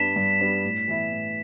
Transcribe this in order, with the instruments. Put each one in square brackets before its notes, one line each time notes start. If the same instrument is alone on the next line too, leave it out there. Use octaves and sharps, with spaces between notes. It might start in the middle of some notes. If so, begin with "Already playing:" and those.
Already playing: [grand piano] G2 G3 B3 D4 [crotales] B6 E7
[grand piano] G2
G3 B3 D4
A2
E3 B3 E4
A2